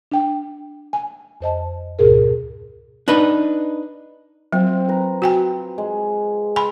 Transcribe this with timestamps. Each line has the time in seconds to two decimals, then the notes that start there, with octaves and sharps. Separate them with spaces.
0.12 D4 G5
0.93 G#5
1.41 F2 C5 D#5 A5
1.99 D2 G#2 B2 G#4 A#4
3.08 D4 D#4 B4
4.53 F#3 C4 F4
4.89 B4 A#5
5.22 F#4 G5 G#5
5.78 G#3
6.56 G#5 B5 C6